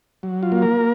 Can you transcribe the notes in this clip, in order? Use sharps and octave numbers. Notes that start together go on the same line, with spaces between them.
F#3
F4
A#3
A#4